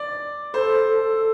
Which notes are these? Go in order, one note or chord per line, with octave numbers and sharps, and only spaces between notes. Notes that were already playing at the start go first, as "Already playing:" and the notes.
Already playing: D5
A4 C5
A4